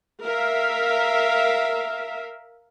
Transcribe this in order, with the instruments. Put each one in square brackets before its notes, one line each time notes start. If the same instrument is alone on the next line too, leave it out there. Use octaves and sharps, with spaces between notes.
[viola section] A#4 E5 F5